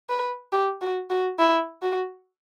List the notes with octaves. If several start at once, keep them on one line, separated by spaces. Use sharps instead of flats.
B4
G4
F#4
F#4
E4
F#4